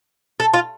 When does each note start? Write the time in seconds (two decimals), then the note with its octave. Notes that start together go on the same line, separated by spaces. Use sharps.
0.40 A4
0.54 F4